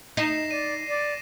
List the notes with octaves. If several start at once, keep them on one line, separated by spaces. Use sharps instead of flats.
D#4 A#6 C7 E7
D5 D#7
D5